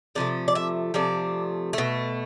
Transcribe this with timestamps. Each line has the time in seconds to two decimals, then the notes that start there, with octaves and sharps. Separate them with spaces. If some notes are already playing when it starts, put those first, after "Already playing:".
0.15 C3 F3 A3 D5
0.48 D5
0.55 E5
0.94 C3 F3 A3 D5
1.73 B2 A3